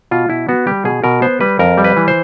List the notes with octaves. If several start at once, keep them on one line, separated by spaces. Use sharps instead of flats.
B2 F4
B2 E4
B3 F#4
G3 G4
B2 G#4
B2 A#4
B3 C5
G3 B4
F2 A#4
G3
B4
E3
C5